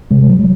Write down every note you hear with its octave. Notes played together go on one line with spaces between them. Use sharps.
C3 G#3
F#3